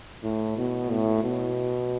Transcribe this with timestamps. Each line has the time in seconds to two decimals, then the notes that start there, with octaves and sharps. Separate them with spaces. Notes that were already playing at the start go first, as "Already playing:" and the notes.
0.23 A2
0.57 B2
0.90 A2
1.24 B2